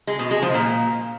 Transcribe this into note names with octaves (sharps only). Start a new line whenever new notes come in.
G#3
B2
G#3
F3
A#2